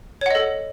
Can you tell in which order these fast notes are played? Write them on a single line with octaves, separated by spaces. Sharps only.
C#5 F#5 D#5 A4